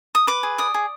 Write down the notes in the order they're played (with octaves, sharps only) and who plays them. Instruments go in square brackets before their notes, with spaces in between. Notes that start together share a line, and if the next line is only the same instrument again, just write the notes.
[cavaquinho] D#6
B4 D6
G#4
D5 D#6
G#4